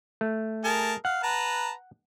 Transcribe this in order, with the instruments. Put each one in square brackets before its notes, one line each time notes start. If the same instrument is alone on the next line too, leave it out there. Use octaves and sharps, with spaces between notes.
[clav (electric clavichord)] A3
[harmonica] G#4 A#4 A5
[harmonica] F5 [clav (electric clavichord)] F#5
[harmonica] B4 A5 A#5